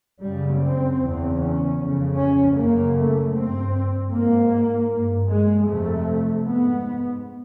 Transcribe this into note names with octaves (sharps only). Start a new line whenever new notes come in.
F#2 C#3 G3
C4
E2 C#3
C#4
F2
C#3
C#4
F#2 C#3 A#3
A3
G2 C4
G#2 A#3
G2
G#3
F2 C3 A3
G#2 B3